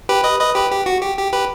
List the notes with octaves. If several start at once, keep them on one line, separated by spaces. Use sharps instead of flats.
G4 B4
B4 D#5
B4 D#5
G4 B4
G4
F#4
G4
G4
G4 B4